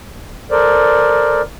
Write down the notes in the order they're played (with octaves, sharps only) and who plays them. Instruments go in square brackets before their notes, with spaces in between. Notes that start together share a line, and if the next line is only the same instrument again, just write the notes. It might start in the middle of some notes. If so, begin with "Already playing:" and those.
[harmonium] A4 A#4 C5 D5